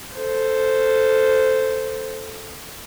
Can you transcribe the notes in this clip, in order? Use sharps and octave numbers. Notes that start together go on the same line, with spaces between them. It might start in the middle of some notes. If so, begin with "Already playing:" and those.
A4 C5